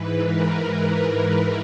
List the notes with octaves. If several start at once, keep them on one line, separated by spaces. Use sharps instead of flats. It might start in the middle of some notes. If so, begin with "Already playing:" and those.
Already playing: G#2 E3 B4
A#4